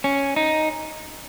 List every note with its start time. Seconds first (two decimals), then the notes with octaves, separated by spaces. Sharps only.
0.04 C#4
0.36 D#4